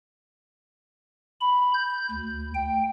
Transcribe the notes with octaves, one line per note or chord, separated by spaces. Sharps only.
B5
G6
D2
G5